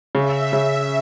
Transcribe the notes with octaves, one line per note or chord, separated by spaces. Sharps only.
C#3 E5
C#3